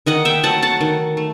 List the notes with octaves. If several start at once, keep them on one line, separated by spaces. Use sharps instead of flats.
D#3 D#5 F#5
E5 G5
F#3 A3 F#5 A5
F#5 A5
D#3
A3